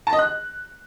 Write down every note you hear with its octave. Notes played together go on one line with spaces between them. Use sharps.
A5
D#5
F#6